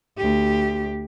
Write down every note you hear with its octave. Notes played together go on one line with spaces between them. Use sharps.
D2 G4